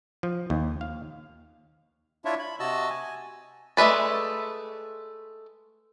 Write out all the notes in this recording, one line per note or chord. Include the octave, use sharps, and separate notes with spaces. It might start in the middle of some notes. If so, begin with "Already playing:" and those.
F3
D#2
F5
D4 E4 F4 C#5 E5
B5
C3 F#4 D#5 A5 E6
G#5
G#3 A3 A#4 B4 D5